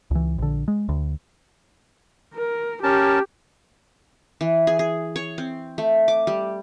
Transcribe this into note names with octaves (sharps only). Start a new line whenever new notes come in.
C#2 E3
A#1 D3
G#3
D2
A#4
C#4 G4 A#4 A5
E3
G#4
G#4
C#5
C4
A3
D6
G3